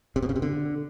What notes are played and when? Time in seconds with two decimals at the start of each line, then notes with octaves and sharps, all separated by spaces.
0.16 C3
0.22 B2
0.29 C#3
0.36 C3
0.42 D3